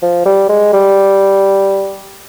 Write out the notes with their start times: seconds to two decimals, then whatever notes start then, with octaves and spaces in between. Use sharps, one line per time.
0.03 F3
0.25 G3
0.49 G#3
0.73 G3